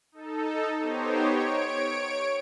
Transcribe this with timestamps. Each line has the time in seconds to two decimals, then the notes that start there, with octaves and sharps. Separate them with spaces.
0.12 D#4 A4
0.80 B3 D#4 G4 C5 C#5
1.27 C#5 D7